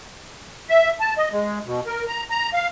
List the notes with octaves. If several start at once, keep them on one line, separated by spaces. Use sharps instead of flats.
E5
A5
D#5
G#3
B2
A#4
A#5
A#5
F5